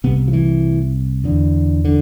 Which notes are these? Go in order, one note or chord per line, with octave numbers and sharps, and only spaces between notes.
C2 C3 B3
F3
E3
E2 D3
D3